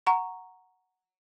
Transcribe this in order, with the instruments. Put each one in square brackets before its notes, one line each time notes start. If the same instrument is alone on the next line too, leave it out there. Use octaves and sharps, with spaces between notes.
[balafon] F#5 A#5 C#6